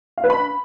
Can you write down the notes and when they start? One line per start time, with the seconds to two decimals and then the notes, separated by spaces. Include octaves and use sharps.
0.18 F5
0.24 B4
0.30 B5